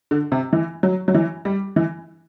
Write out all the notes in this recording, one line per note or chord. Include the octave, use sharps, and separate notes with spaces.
D3
C3
E3
F#3
F#3
E3
G3
E3